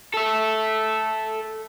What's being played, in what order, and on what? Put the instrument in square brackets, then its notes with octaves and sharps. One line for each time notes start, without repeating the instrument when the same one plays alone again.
[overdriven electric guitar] A4 E5